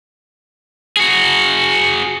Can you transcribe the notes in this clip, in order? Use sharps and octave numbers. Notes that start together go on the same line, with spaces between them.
F#4 G#4